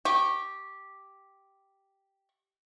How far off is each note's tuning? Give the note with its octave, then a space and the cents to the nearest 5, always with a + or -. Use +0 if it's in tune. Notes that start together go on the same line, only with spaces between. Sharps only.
G4 -5 C#6 -20